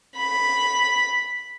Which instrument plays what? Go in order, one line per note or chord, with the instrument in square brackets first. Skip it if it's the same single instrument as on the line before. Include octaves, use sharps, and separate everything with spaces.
[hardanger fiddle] B5